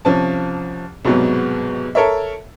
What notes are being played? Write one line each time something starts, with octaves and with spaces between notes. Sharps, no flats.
C2 F3 C#4 A5
C2 G#2 B2 F#3 G#3 B3
A4 A#4 C#5 E5